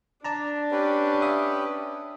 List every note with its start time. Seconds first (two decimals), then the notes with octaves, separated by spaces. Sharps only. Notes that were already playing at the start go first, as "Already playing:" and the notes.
0.24 D4 D5 A5 A#5
0.71 C#4 G4 B4
1.22 E5 F5 D#6